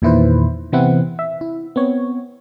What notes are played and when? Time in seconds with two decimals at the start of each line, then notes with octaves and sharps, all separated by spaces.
0.02 E2 A#2 D#3 E4 B4 C5
0.72 C3 E3 B3 C4 E4 F#5
1.19 E5
1.41 E4
1.76 B3 C4 C#5